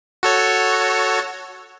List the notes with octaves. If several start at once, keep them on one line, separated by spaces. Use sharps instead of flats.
F#4 A4 C#5